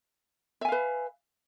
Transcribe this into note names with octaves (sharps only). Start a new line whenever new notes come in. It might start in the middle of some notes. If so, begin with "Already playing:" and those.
B4 E5 F5 G#5